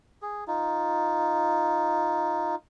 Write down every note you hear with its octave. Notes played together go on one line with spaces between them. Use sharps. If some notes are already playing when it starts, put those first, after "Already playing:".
G#4
D#4 F4